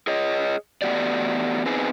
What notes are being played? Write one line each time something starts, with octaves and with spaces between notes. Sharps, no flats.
G#4 C#5 D#5
E2 A3 B3 F#4 G4 D5
B3 C4 D#4 G#4 B4